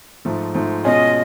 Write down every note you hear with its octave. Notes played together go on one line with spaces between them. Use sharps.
G#2 F3 A3
G#2 F3 A3
B2 G#3 C#4 F4 G#4 D#5